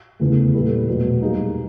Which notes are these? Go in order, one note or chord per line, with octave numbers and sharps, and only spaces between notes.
E2 C#3 E3 A3
A#2 G3 B3 E4 A4
E2 B2 F#3 A3
G3 A#3 D#4 G#4